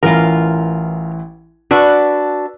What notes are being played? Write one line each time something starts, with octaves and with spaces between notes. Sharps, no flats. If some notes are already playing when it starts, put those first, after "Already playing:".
A1 E3 F4 A#4
D4 F#4 B4 E6